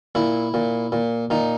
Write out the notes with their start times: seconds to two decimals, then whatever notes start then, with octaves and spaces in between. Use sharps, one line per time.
0.15 A#2 E4
0.54 A#2
0.92 A#2
1.30 A#2 D#4